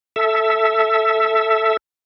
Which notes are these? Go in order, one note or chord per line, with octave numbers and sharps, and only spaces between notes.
A4 E5